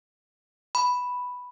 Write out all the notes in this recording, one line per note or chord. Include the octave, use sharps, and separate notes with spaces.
B5